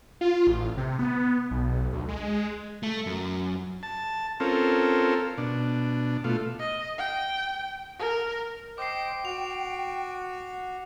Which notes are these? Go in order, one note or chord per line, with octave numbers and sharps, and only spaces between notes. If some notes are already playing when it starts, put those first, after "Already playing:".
F4
A1
C3
B3
B1
D2
G#3
A3
F#2
A5
C4 C#4 F4 A4 A#4
B2 D4
B2 A3 F4
D#5
G5
A#4
C5 D#5 G5 D6 C7
F#4 F7